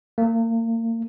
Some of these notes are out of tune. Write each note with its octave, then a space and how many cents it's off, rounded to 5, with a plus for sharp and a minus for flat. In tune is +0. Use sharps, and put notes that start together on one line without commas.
A#3 -35